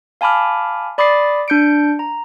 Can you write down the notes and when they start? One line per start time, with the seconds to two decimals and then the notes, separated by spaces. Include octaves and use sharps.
0.21 F5 G#5 A5 B5 D6 F6
0.98 D5 B5 D6 D#6 A6 C7
1.48 D4 G6 C#7 D7
1.99 A#5